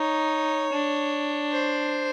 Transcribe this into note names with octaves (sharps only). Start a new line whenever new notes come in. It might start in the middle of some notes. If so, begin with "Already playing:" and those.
Already playing: D#4 C#5
D4
C5